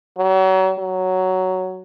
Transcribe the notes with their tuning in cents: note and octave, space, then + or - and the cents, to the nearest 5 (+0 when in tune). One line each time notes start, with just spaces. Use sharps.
F#3 +35
F#3 +5